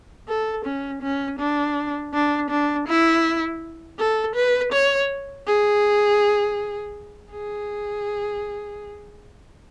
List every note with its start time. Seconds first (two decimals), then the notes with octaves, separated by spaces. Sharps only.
0.28 A4
0.65 C#4
1.02 C#4
1.39 D4
2.13 D4
2.50 D4
2.88 E4
3.99 A4
4.36 B4
4.72 C#5
5.47 G#4
7.32 G#4